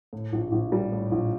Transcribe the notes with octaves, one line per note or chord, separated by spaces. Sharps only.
A2
A#1
A#1
G3
A2
A#1